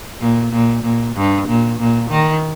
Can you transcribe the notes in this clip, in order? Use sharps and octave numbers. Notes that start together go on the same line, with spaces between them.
A#2
A#2
A#2
G2
A#2
A#2
D#3